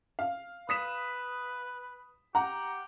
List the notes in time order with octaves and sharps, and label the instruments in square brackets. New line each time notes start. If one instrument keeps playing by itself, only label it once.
[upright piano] F5
[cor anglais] B4 [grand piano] D#6 B6 E7
[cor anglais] G4 [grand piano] F#5 [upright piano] A#5